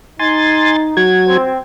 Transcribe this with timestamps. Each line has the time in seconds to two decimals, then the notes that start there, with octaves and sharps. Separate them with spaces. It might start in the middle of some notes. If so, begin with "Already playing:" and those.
0.19 D#4 G#5 C6 A6
0.97 F#3 F#4 G#6
1.27 C4